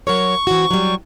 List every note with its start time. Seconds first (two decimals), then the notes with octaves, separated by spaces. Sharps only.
0.07 F#3 A#4 C#5 C#6
0.47 E3 C4 F#4
0.71 F#3 G3